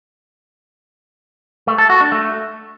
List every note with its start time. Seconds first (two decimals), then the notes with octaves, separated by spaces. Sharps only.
1.67 A3
1.78 A4
1.90 F#4
2.01 D4
2.12 A3